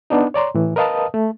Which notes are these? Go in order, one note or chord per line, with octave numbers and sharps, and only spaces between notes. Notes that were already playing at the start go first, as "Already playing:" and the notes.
B3 D4 D#4
C#5 D5 A#5 C6
A2 E3
A#4 B4 D#5 F5 A5 D#6
A3